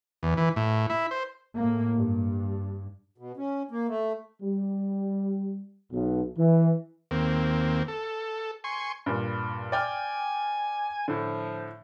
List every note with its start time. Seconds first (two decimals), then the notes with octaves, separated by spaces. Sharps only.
0.23 E2
0.37 E3
0.56 A2
0.90 E4
1.11 C5
1.55 A2 A#3
1.99 G2
3.18 B2
3.37 C#4
3.71 A#3
3.88 A3
4.42 G3
5.92 B1
6.38 E3
7.11 D#2 A#3 C4
7.88 A4
8.64 G#5 C6 C#6
9.06 G2 A#2
9.72 D5 G5 G#5 F6
11.08 A2 D3 F3